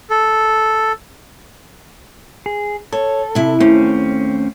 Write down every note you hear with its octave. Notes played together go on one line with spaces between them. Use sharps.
A4
G#4
A4 C#5
C3 E4
D#2 A3 C4 C#4